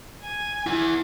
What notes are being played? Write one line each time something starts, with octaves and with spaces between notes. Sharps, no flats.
G#5
E4 F#5